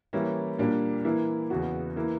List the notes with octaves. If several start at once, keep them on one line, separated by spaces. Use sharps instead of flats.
E3 G3 A#3 C#4 E4
A#2 G3 A#3 D4
E3 A#3 E4
E2 C#3 E3 B3 F#4
E3 A#3 E4